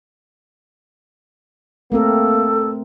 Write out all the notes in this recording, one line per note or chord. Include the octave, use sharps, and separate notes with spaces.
A3 A#3 C4 A4 A#4